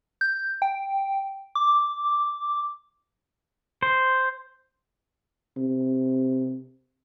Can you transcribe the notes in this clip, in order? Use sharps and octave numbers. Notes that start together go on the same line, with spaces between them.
G6
G5
D6
C5
C3